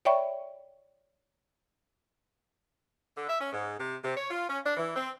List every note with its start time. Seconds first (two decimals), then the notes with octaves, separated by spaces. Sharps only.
0.05 C#5 D5 E5 G5 B5 C#6
3.16 D3
3.28 E5
3.40 C#4
3.53 G#2
3.79 C3
4.04 C3
4.16 C#5
4.31 F4
4.48 C#4
4.64 D4
4.77 E3
4.96 C4